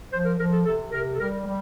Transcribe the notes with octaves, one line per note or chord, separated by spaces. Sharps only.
F3 C5
A#4
F3 A#4
A4
C3 A4
C3 A#4
A4
G3 A#4
G3